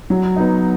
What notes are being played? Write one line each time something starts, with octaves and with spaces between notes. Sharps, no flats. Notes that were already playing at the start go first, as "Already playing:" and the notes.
F#3
B3 D#4